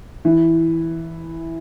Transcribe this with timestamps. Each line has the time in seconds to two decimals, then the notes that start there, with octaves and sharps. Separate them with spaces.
0.25 E3